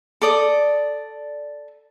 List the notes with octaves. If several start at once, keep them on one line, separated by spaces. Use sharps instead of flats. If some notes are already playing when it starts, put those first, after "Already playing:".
A4 D5 D#6